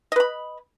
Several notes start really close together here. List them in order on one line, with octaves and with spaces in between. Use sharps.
D#5 B4 B5